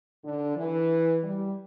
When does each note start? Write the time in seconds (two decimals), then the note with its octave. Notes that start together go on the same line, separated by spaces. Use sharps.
0.23 D3
0.56 E3
1.22 G3